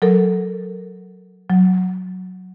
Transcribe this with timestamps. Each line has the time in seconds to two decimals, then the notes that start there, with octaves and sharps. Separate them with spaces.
0.02 F#3 A4 A#4
1.50 F#3